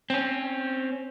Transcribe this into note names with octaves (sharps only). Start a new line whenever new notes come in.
C4 C#4